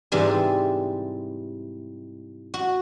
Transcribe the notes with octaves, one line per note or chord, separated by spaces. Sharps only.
G#2 C3 E3 G3
F#4